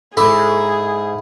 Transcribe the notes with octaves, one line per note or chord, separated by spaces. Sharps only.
G#2 E4 G#4 A4 D6